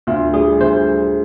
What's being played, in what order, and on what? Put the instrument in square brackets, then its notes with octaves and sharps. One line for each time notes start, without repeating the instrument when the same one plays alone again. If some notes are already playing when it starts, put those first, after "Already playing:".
[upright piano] D2 [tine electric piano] F4
[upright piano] G3 [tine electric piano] G#4
[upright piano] D2 [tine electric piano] C5